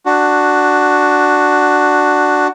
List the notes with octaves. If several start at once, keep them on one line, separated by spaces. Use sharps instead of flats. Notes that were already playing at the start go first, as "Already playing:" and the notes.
D4 F#4